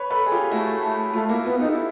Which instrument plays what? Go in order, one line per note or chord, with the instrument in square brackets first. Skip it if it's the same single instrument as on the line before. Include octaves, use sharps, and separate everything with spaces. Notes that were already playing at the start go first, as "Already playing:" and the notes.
Already playing: [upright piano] B4 C#5
A4 B4
G#4
F4 G4
[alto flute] A3 [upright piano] E4 F#4
[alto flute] A3 [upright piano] F4
[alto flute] A#3 [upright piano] E4 F#4
[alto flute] B3 [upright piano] F4
[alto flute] D#4 [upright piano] G4 A4
[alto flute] E4